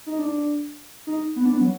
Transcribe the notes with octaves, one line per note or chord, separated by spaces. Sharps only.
D#4
D4
D#4
B3
D4
B3
F#3